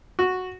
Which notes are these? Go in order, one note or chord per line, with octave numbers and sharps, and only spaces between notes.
F#4